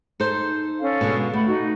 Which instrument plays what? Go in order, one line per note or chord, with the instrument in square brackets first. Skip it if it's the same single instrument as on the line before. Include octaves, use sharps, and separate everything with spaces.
[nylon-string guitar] D#4 A4 C5
[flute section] C#4 A4 F5
[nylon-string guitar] B2 D3 G#3
[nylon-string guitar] A3 [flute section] F#5 B5
[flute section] D#4 F#4